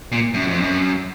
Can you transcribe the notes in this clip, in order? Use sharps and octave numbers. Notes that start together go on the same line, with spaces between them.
A#2
F#2
F2
F#2